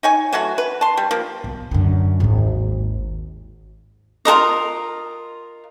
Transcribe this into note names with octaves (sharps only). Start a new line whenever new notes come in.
D#4 C#5 G#5
E3 F#3 A3 F#4
B4
A5 C6
G3
F3 A#3
B1
F#2 D3
G#1 D#2
F4 A4 A#4 D#5